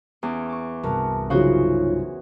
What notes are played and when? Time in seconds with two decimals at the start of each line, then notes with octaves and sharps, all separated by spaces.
0.23 E2 C#4 D6
0.49 C#6 D6
0.84 C2 G2 F#4 A#4 A5
1.30 C#3 F#3 C#4 D#4 F4 F#4 C5 C#5